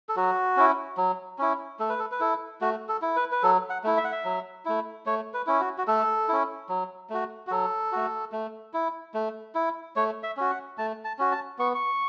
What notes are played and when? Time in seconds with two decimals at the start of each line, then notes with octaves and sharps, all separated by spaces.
0.09 A4
0.16 F#3 F#4
0.57 C#4 E4
0.97 F#3
1.39 C#4 E4
1.80 A3 A4
1.90 B4
1.99 A4
2.12 B4
2.20 E4 A4
2.61 A3 F#4
2.89 A4
3.02 E4
3.16 B4
3.32 B4
3.43 F#3 A4
3.70 F#5
3.84 A3 E4
3.97 E5
4.04 F#5
4.12 E5
4.25 F#3
4.65 A3 E4
5.06 A3 C#5
5.34 B4
5.47 C#4 E4
5.60 F#4
5.78 F#4
5.87 A3 A4
6.28 C#4 E4
6.69 F#3
7.10 A3 F#4
7.47 F#4
7.51 F#3 A4
7.92 A3 F#4
8.32 A3
8.74 E4
9.14 A3
9.55 E4
9.96 A3 C#5
10.23 E5
10.37 C#4 F#4
10.50 F#5
10.78 A3 A5
11.05 A5
11.19 C#4 F#4
11.32 A5
11.59 B3 C#6
11.75 C#6